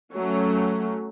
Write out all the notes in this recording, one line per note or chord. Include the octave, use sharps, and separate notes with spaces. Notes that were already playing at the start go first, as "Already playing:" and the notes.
F#3 A3 C#4